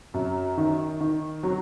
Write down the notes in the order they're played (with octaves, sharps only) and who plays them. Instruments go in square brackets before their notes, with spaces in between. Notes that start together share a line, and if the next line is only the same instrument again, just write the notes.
[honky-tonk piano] F#2
D#3
D#3
F#3